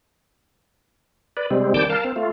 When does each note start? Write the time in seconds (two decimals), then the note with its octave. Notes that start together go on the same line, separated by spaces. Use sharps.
1.37 B4 D5
1.51 C3 G3 G#3 C4
1.74 D#3 G3 G5 A5 D6 G6
1.90 A#4 F5 A5
2.04 C4
2.16 A3 F4